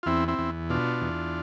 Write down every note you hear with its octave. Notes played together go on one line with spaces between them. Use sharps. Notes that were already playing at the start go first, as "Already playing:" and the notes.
F4
E2 C4 E4
C4 E4
E2
B2 D4 F4
E2